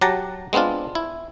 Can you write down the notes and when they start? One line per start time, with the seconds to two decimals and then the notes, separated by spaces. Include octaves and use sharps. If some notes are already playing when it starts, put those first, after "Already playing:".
0.01 F#3 G4 F#5 A5 A#5
0.53 G#3 B3 C4 D4 F4
0.95 E4